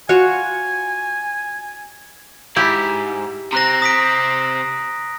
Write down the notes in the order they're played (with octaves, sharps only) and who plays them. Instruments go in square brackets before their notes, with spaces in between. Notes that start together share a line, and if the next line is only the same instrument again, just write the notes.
[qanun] F4 F#4 C#5 [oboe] G#5
[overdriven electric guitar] G#2 [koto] E4 G4
[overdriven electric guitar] C3 C4 [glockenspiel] A#5 F#6 A#6
[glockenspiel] D#6 B6 D7